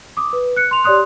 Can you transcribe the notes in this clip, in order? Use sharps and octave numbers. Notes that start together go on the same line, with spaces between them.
D6 D#6
B4
F#6 C#7
C6 F7
G4 C#5 D5 C6 D#6 F#6